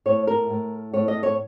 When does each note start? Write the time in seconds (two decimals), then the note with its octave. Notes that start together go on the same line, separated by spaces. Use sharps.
0.06 A2 C#5
0.27 A#4
0.50 A2
0.93 A2 C#5
1.08 D#5
1.23 C#5